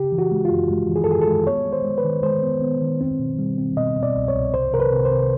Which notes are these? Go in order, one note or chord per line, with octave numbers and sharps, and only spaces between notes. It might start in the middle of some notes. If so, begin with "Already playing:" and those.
Already playing: C#3 G4
E3
F#4
G#3
F4
F#2
G#3
E3
G#4
A4
F#2 G#4
A4
G#3
B3 C#5
G#3
C5
G#3
B4
D#3
G#3 C5
B3
B3
D#3
C4
B2
G3
C4
B2 D#5
B2
D5
C2
C#5
C2
C3 C5
C3 A#4
B4
C3
C5
C3